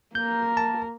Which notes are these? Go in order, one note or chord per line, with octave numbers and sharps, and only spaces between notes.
A#3 A#4 G6
A5